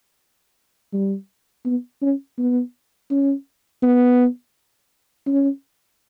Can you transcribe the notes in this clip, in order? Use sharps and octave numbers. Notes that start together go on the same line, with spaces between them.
G3
B3
C#4
B3
C#4
B3
C#4